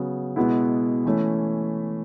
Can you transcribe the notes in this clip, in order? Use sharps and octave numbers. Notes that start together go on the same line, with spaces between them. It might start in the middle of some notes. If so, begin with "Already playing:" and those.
Already playing: C#3 F#3 B3
B2 G#3 B3 E4
E3 A3 C#4 E4